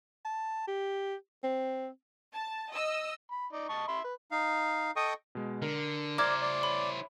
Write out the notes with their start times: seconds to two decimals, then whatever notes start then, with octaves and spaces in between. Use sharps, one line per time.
0.25 A5
0.67 G4
1.43 C4
2.33 A5
2.73 D#5 E6
3.31 B5
3.53 D#4 D5
3.69 D#5 A5 C#6
3.88 E5 B5 C6
4.04 B4
4.31 D#4 F5
4.96 A4 D#5 G5 C#6 D#6
5.35 B2 G#3
5.62 D3 A#4
6.18 E4 C5 D5 A#5 D6 F6 G#6
6.42 D5
6.63 C#5 B5